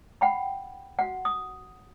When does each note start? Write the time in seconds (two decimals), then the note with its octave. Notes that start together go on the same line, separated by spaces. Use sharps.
0.21 F#5 G5 B5
0.99 F#4 F#5
1.25 D#6